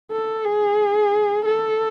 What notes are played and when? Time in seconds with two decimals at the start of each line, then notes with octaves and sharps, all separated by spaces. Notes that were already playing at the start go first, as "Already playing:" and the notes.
0.12 A4
0.45 G#4
1.45 A4